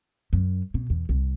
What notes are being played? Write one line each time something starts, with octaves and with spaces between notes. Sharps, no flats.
F#2
B2
E2
C2